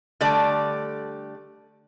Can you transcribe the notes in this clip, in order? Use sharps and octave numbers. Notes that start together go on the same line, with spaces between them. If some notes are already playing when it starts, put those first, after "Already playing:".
D3 G3 A3 D5